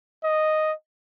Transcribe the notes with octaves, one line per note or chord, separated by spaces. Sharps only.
D#5